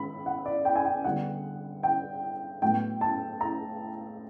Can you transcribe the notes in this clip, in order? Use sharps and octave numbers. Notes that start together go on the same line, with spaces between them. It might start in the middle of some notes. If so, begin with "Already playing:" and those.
Already playing: D#3 G#3 B5
F#5
D5
G5
G#5
G5
D3 G3 B3 F#5
G5
A2 F#3 B3 G5
A5
A#5